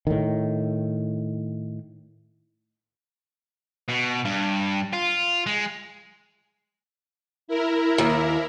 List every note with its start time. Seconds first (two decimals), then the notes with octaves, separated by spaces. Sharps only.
0.07 A2 D#3
3.88 B2
4.25 G2
4.93 F4
5.46 G#3
7.48 E4 A#4
7.98 D#2